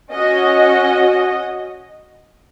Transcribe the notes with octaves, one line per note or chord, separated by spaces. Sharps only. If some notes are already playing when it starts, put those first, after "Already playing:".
C#4 F#4 D#5